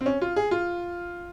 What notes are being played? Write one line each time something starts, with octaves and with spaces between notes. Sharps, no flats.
C4
C#4
F4
G#4
F4